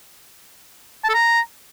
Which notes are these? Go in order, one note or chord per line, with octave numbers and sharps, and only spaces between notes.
A5
A4
A#5